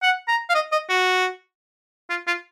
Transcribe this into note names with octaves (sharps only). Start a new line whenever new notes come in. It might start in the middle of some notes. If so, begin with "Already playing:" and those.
F#5
A#5
F5
D#5
D#5
F#4
F4
F4